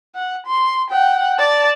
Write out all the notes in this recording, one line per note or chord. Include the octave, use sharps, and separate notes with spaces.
F#5
C6
F#5 G5
D5 A5